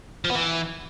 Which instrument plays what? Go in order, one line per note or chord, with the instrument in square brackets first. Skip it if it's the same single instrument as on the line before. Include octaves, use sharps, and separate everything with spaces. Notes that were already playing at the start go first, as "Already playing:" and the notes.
[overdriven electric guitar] F3
B3
E3